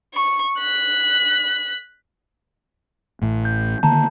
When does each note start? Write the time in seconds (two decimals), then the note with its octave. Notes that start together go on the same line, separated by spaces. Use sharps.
0.14 C#6
0.58 F#6 B6
3.22 A1 A2
3.45 G6
3.83 D3 D#3 A#3 A5 A#5